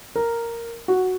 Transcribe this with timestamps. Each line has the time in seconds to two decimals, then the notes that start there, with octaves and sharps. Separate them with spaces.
0.16 A#4
0.88 F#4